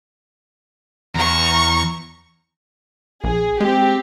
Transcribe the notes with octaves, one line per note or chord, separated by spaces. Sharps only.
E2 A#5 C#6
A#1 G#4
G#3 C4 G4